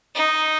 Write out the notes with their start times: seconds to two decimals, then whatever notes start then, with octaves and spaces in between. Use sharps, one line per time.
0.15 D#4